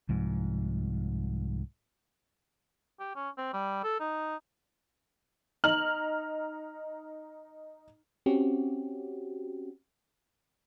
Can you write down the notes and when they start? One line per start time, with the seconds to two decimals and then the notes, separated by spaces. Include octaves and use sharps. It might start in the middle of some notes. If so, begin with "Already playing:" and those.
0.09 C2 G#2 F3
2.99 G4
3.16 C#4
3.38 C4
3.53 G3
3.84 A4
4.00 D#4
5.64 D#4 A#5 F6 F#7
8.26 C4 C#4 F#4 G4